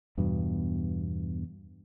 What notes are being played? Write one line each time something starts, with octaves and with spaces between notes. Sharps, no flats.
E2 G2 B2